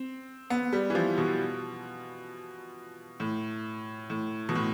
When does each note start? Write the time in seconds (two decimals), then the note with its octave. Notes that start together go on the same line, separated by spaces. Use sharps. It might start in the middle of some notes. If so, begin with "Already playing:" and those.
Already playing: C4
0.50 B3
0.73 G3
0.90 E3
0.95 F3
1.18 B2
3.20 A2
4.10 A2
4.49 B2
4.55 A2